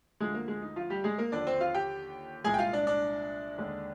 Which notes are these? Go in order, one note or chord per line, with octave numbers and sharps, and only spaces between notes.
D2 D3 F3 G#3 G#4
A#3 A#4
G#3 G#4
D#4
F3 F4
G3 G4
G#3 G#4
A#3 A#4
D#2 D3 F3 D4 D5
C4 C5
F4 F5
G4 G5
C2 A#2 G#3 G#4 G#5
G5
F4 F5
D4 D5
D4 D5
D#2 D3 G#3